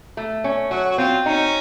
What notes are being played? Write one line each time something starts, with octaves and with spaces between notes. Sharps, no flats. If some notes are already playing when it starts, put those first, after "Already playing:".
A3
C#4
F#3 F#4
F#4
C4 F4
C#4 D#4